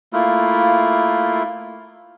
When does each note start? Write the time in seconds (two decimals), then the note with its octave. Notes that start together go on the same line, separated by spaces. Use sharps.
0.13 A3 A#3 E4 F4